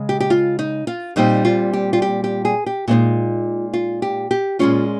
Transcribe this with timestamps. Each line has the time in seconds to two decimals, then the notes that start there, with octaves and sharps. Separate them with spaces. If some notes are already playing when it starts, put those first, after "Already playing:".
Already playing: C#3 G#3
0.09 G4
0.20 G4
0.30 F4
0.59 D#4
0.87 F4
1.16 A#2 G3 C4 D#4
1.45 F4
1.73 G4
1.93 F4
2.02 G4
2.24 G4
2.45 G#4
2.66 G4
2.88 A#2 G#3 C4 D#4 F4
3.73 F4
4.02 G4
4.31 G4
4.59 A#2 G#3 C#4 F4